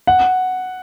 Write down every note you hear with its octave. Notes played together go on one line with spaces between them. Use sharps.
F#5